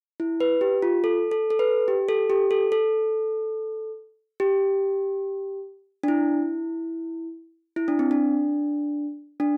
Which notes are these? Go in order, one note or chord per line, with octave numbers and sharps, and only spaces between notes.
E4
B4
G4
F4
A4
A4
A4
B4
G4
A4
G4
A4
A4
G4
D4
E4
E4
D4
C4
D4
D4